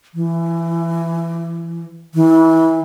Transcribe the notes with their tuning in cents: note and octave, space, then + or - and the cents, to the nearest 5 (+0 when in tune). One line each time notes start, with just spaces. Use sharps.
E3 +20
E3 -25